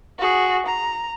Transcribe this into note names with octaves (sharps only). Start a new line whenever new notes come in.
F#4 G#4
A#5